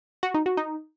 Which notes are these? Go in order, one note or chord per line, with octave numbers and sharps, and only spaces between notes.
F#4
D#4
F#4
D#4